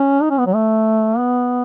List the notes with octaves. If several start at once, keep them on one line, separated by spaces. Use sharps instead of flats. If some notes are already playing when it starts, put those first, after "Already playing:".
Already playing: C#4
D#4
C#4
B3
F#3
A3
B3